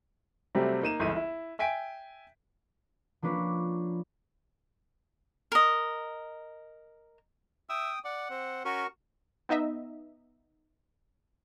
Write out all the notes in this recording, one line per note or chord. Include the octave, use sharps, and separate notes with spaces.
C3 F#3 G3 A3 C4
A#3 D#4 D#7 E7
G1 C#2 E3 D#7
E4
E5 G5 G#5 B6 D7
F3 A#3 D4 B4 C#5
A#4 D#5
E5 G5 D#6
D5 F#5
C4
C#4 F#4 A#4 C#6
B3 D#4 D#5 E5